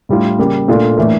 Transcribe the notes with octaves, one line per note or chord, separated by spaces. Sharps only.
A2 G3 D4 F4
C#3 G3 A#3
A#2 A3 D4 F4
A2 E3 A#3 D4